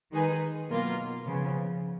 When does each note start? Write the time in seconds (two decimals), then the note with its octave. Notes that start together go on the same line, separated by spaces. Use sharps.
0.12 D#3 G#3 D#4 G#4 B4
0.69 B2 F#3 A#3 F4 A#4
1.26 C#3 F3 B3